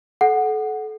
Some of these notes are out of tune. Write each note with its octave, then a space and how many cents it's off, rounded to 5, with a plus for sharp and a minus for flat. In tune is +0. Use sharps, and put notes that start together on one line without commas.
A4 -30 F#5 +0